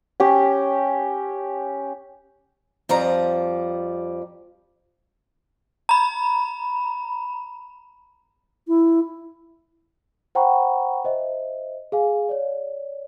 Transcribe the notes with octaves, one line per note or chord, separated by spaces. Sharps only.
C#4 G4
F2 F3 G3 A#5
A#5 B5
E4
C5 F#5 G5 A#5 B5 C#6
C5 D#5 E5
G#4 F5 G#5
C#5 D5